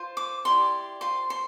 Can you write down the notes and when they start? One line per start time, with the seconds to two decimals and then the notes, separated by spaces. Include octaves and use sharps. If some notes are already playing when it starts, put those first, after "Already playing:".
Already playing: F4 C5
0.17 D6
0.45 E4 G4 D5 C6
1.01 F4 C5 C6
1.30 C6